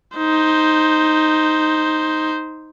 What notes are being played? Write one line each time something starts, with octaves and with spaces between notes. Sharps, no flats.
D#4 C5